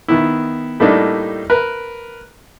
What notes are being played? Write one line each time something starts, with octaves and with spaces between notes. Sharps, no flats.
D#3 B3 E4
A2 G3 A3 A#3 D4 D#4
A#4 B4